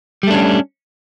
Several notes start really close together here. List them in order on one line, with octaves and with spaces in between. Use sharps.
G3 A3 D4 C#4